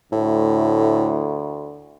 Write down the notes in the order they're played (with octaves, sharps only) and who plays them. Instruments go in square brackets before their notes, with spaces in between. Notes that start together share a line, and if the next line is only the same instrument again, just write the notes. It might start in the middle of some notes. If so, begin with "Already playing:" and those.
[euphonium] D2 [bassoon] A2